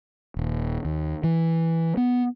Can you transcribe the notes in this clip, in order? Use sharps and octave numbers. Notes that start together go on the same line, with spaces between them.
D#1
D#2
E3
B3